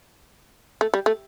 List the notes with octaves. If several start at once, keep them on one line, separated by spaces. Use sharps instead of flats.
A3
G3
A3